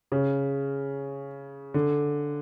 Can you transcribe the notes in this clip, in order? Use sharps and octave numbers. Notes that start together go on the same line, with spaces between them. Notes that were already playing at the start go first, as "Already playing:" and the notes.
C#3
D3